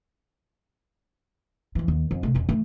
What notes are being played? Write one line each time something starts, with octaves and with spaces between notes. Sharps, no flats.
F2 E3
D#2
F2
C3 A3
E1 C#4
E3 A3